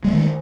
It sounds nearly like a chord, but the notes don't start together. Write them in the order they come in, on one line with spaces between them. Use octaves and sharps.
G#3 F#3 A3 D#3